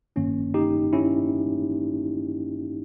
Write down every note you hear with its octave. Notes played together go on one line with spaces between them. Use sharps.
G1 G2 D#3 A#3 C#4
D#4 G4
C#4 E4